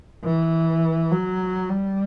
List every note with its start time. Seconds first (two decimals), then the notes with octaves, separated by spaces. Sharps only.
0.24 E3
1.11 F#3
1.69 G3